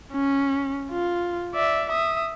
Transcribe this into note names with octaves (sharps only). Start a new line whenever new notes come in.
C#4
F4
D5 E5
E5 D#6